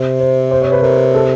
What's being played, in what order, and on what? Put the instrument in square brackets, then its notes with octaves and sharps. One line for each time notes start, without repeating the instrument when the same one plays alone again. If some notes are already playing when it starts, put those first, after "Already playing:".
Already playing: [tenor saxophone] C3
[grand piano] C5
C5
C#5
B4
[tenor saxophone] C3 [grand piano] A#4
[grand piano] A4